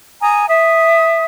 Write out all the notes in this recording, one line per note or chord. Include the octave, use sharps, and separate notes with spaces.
G#5 A#5 D#6
E5 D#6